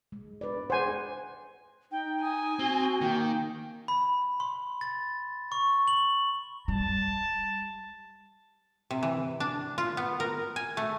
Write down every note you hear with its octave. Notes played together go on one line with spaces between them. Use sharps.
G#3
B4 D5
G#4 C5 F#5 G#5
D#4 G5
G#5 D#6
C4 F#4 G7
D#3 A#3 G5
B5
C6
A6
C#6
F#7
G3 A5
C3
E3
D4
F4
B3
A#4
G#5
A3